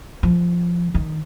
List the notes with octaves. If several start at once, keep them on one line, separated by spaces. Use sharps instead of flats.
F3
D#3